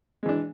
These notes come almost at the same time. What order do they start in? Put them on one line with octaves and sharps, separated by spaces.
G#3 E3 D4